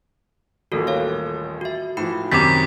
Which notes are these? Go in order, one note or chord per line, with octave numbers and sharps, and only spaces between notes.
D#1 A1 A#3 F#4 A4
C#5 F5
F#4 E5
A2 E3 F3 D#4 F#4 B5
F#2 C3 D#3 D6 A6 B6